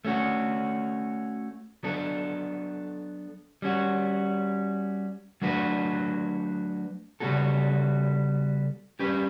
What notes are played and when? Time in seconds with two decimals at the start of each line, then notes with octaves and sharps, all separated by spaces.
0.05 A3 C#4 F#4
1.83 F#3 B3 D4 A4
3.62 G3 C#4 F#4
5.42 F#3 A3 D4 F#4 B4
7.20 C#3 G3 B3 F#4 A4
8.99 G3 C#4 G4 B4